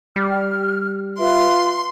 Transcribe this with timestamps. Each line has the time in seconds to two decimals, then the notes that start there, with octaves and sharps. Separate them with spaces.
0.16 G3 F6
1.18 F4 B4 E5 C6